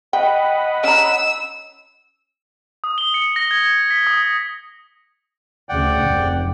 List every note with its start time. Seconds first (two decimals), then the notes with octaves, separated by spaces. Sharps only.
0.13 D#5 F#5 G5 B5
0.84 C#4 A#5 E6
2.84 D#6
2.98 G7
3.14 C#7
3.36 A#6
3.51 G#6
3.66 G#6
3.90 B6
4.07 D#6
5.69 D2 C#3 D5 F#5 G5
6.01 F1